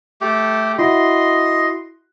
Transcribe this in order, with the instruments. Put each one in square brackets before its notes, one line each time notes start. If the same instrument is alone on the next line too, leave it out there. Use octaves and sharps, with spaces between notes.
[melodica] A3 G4
[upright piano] E4 F#4 [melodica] D#5 C6